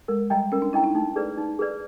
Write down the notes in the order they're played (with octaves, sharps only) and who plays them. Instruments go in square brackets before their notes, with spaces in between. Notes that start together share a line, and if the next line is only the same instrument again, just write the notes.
[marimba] G#3 [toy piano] A#4
[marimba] G3 [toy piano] D#5 G5 A#5
[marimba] C#4 [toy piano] A#4
[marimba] D4
[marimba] E4 [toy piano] D#5 G5 A#5
[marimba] D#4
[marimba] A3 [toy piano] D#4
[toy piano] G#4 B4 D5
D#4
G#4 B4 D5